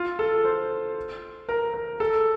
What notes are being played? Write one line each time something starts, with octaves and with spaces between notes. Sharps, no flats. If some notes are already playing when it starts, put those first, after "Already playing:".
Already playing: F4
A4
C5
A#4
A#4
A4